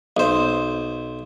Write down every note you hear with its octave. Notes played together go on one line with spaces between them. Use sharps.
B1 C5